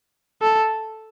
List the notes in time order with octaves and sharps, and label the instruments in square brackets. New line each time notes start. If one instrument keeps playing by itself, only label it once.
[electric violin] A4